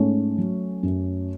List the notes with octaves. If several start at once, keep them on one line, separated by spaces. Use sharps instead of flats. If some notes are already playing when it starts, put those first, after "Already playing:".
Already playing: G#2 A3 C#4
F#3
F#2